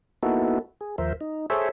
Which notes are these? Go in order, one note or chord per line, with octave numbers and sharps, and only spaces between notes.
A#3 B3 D#4 E4 F#4 A4
G#4
D#2 F3 A#4 C5 E5
D#4
G#4 A4 C5 C#5 E5